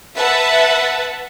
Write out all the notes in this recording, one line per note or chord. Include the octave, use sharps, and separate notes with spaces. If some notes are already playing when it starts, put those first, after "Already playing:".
B4 E5 F#5 A5